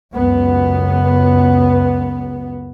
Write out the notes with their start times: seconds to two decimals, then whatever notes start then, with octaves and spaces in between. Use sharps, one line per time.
0.14 C#2 F#2 B3